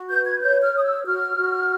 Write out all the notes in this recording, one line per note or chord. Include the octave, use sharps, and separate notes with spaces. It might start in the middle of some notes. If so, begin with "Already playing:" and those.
Already playing: F#4
B4 G6
G#6
C#5 G6
F6
C#5 D#6
E6
F#4 F6
F#4